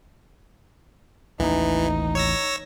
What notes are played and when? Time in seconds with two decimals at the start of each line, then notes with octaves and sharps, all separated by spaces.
1.40 A1 D#2 E3 D#4
2.15 C#5 E6 A#6